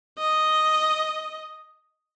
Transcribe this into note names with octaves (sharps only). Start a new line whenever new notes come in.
D#5